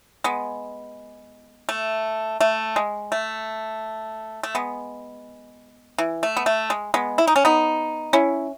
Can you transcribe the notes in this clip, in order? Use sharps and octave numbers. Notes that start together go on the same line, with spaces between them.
G#3 B3
A3
A3
G#3
A3
A3
G#3 B3
E3
A3
B3
A3
G#3
G#3 B3
E4
D#4
C#4
B3 D#4
C#4 E4